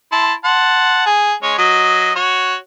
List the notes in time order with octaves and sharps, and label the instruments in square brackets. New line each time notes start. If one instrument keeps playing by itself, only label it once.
[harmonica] E4 A5 C6
F#5 A5 C6
G#4
G#3 C#4 C#5
F#3 D#5
F#4 C#5